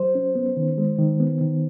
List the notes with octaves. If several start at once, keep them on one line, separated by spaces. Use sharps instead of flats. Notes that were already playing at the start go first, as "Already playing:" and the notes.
Already playing: F#3 C5
C#4
B3
D#3
G#3
D#3
B3
D#3